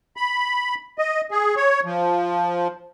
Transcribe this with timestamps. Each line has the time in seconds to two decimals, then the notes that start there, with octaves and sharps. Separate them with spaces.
0.17 B5
0.98 D#5
1.31 G#4
1.56 C#5
1.85 F3